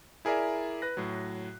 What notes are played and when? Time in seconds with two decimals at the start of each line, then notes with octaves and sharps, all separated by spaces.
0.25 E4 G#4 A#4 D5 E5
0.82 B4 F#6 A#6
0.97 A2 F#3